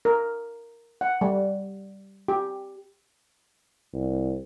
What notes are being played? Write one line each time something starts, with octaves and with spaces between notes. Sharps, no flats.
A#4
F#5
G3
G4
C2